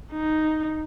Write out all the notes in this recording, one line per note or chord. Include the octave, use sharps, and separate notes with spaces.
D#4